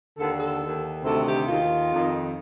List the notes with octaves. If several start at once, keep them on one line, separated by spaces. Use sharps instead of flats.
D#2 D3 A4
A4
D#2 D#3
D2 C3 D#3 A4
G4
D#2 D#3 F4
F2 D#3